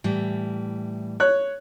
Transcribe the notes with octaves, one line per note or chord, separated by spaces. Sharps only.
A2 E3 G3
C#5 F#6